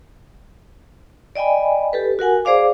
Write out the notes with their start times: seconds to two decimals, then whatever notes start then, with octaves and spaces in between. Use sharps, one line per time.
1.35 D5 D#5 G5 G#5 B5
1.93 G4 A4 B4
2.19 F#4 A#4 F#5 G#5
2.45 G#4 C5 D5 F5 D6